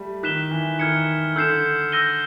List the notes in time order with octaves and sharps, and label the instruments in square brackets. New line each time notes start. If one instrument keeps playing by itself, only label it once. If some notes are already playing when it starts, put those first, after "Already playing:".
Already playing: [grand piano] G3 A3
[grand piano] D#3 [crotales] F#6 B6 E7 G7
[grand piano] E3
[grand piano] D#3 [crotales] F6 G#6 C#7
[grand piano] D3 [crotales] E6 G6 C7 E7
[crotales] E6 G6 A#6 D#7 G7